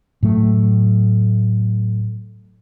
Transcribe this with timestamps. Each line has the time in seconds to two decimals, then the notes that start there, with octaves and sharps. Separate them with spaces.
0.23 A2 F#3 A3